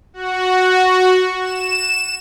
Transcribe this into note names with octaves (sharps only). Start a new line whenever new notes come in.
F#4
E7